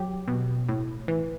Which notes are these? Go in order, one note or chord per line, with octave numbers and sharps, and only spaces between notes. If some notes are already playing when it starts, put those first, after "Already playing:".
Already playing: F#3 G4
B2
A2
E3